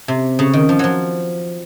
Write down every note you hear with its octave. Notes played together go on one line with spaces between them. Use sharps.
C3
C#3
D#3
F3
F3 F#3